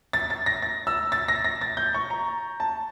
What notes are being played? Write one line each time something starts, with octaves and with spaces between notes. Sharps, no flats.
A6
A6
A#6
A6
E6
A6
A#6
A#6
A6
G6
C#6
A#5
A5